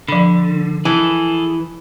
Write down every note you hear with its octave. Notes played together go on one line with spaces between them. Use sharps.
D3 F3 B5
E3 G#4 A4